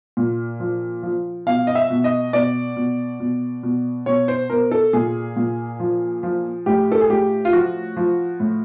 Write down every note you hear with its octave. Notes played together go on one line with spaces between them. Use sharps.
A#2
F3
F3
B2 F5
D#5
E5
B2
D#5
B2 D5
B2
B2
B2
B2 C#5
C5
B2 A#4
A4
A#2 G#4
A#2
F3
F3
A2 G4
A4
G#4
A2 G4
F4
F3 F#4
F3
A2